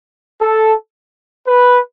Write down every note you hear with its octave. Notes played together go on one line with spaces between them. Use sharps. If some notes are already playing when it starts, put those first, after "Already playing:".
A4
B4